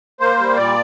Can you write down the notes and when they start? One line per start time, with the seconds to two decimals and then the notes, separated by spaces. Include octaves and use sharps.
0.20 A#3 C5
0.39 G3
0.57 A#2 D5